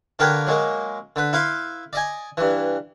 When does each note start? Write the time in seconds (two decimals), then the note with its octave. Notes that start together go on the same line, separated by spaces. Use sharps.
0.19 D3 A#3 G4 A#4 B4 C#5
0.47 F#3 G#3 A#3
1.16 D3 B4
1.33 E4 B4 F5 C6
1.93 D5 D#5 G#5
2.37 G2 E3